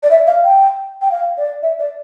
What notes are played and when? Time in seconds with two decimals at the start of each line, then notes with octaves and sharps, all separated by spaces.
0.03 D5
0.11 E5
0.27 F5
0.45 G5
1.02 G5
1.11 F5
1.38 D5
1.62 E5
1.79 D5